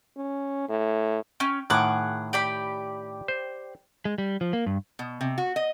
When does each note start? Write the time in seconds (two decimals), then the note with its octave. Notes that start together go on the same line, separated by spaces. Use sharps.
0.17 C#4
0.69 A2
1.40 C#4 G5
1.70 A2 D#3 G#4 F#5 D6
2.33 G4 D5 B5
3.28 C5
4.05 G#3
4.18 G3
4.41 F3
4.53 A#3
4.66 G2
4.99 B2
5.21 C3
5.38 F#4
5.56 D#5